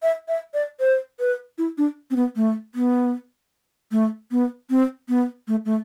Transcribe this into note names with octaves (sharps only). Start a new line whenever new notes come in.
E5
E5
D5
C5
B4
E4
D4
C4
B3
A3
B3
A3
B3
C4
B3
A3
A3